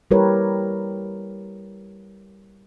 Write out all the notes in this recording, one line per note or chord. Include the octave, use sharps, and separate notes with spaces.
G3 E4 G4 A#4 B4 C#5